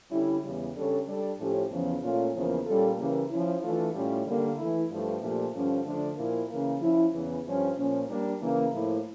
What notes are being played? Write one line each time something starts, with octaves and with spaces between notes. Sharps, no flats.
D3 G3 C#4 E4
E2 C#3 G3
C#3 G3 D4 A4 C#5
G3 D4 A4 D5
A2 F3 A3 C#4 G4
E2 C#3 F3 C#4
A#2 A3 C#4 F4
E2 C#3 F3 A#3
A#2 G3 C#4 F4 A4
C#3 E3 G3 A#3
F3 C#4 E4
E3 A3 D4 F4
A2 G3 C#4 F4 C#5
D3 G3 A#3
E3 A3 E4
G2 F3 A3
A#2 F3 A3 D4 G4
G2 D3 F3 C#4
D3 F3 A3 D4
A#2 F3 A#3 E4 A#4
C#3 E3 A#3
F3 C#4 E4
E2 C#3 E3
G2 F3 C#4
A#2 F3 C#4
G3 A#3 D4
C#3 E3 A#3
A2 F3 A#3 E4